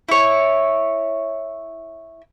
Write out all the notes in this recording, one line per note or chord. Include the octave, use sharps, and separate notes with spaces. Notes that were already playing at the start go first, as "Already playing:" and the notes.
E4 C#5